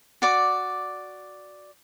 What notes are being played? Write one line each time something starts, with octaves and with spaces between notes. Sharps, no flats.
F#4 D5 D6